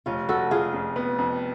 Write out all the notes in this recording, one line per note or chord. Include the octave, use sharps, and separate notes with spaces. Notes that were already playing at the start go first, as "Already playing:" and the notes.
F1 C#4 F4
F1 F#4 A4
F1 F4 G#4
F2
B3
F2